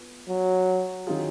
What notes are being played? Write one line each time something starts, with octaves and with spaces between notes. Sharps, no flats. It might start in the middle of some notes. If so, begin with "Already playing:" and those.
Already playing: B3 F4
F#3
D#3 F#3 C#4 F4 G#4